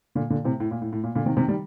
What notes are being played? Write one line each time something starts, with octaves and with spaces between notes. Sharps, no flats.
A#2 D3
A#2 D3
A2 C3
A2
A#2
A2
A2
A#2
A#2 D3
C3 D#3
C3 D#3
D#3 G3